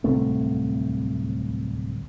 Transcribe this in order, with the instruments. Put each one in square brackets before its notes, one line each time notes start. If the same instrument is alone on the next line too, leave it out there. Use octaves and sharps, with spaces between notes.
[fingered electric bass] D1 C2 A3 C4